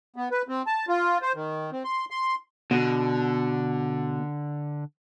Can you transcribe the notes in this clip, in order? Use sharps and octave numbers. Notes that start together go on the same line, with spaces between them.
B3
B4
C4
A5
F4
C5
D#3
C4
C6
C6
B2 D3